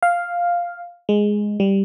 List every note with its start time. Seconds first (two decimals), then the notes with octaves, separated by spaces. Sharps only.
0.03 F5
1.09 G#3
1.60 G3